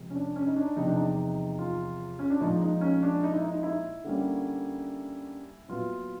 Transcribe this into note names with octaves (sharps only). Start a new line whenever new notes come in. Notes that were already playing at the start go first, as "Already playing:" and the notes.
Already playing: C3 F3 G#3
C#4
D4
C#4
D#4
D4
E2 C3 F3 D#4
D4
D#4
F4
C#4
D4
A#2 F3 G#3 D#4
D#4
C#4
D4
D#4
E4
D#4
E4
D3 G3 A#3 C#4
A#2 F#3 B3 F4